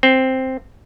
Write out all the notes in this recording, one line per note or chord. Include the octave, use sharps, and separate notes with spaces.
C4